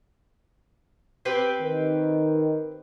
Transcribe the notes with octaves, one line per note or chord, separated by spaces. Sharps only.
C4 G4 B4
D#3